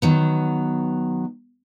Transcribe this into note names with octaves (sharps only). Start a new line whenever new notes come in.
D#3 F#3 B3